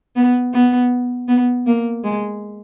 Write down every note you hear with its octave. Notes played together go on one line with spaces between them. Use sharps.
B3
B3
B3
A#3
G#3